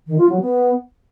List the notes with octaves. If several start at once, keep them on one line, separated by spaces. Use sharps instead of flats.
D#3
F4
F#3
B3